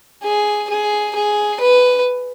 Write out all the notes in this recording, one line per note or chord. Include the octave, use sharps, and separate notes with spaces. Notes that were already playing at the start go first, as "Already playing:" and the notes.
G#4
G#4
G#4
B4